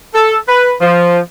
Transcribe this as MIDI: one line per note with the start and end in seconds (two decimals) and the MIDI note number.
0.14 0.36 69
0.48 0.72 71
0.81 1.19 53